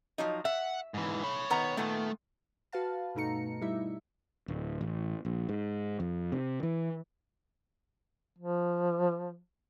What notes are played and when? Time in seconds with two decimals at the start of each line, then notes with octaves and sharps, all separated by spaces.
0.18 F3 F#3 D#4
0.45 E5 F#5
0.94 G#2 E3
1.23 C#5 B5
1.50 D#3 B3 A#5
1.77 A#2 D#3 A3 B3
2.72 F#4 B4 F5 A5
3.15 G2 B2 A3 D#4 A#5 C#7
3.61 G3 D#4 E4 E5
4.48 D1
4.81 A1
5.25 A#1
5.49 G#2
6.00 F2
6.32 C3
6.63 E3
8.39 F3